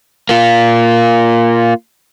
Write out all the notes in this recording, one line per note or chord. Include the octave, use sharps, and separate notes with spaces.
A#3 F4